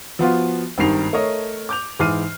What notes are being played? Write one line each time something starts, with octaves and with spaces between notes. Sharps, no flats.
F3 B3 F4 F#4
G#1 G2 D#3 C7 F7
A3 A#4 C#5 D#5
D6 G6 F7
G#2 E3 D6 F6 C7 D#7